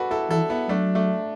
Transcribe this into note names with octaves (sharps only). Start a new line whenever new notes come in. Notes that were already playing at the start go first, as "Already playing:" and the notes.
Already playing: F#4 A4 B4 D5
E4 A4
E3 E4 A4
B3 E4
F#3 A3 D4
A3 D4